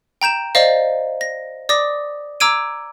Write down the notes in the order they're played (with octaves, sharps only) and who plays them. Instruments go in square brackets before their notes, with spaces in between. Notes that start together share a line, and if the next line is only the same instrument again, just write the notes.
[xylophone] G5 A#5 G6 E7
C5 D5 D#5 F5
A#6
D5 D6 D#6 A#6
A#5 D6 E6 G#6 D7 D#7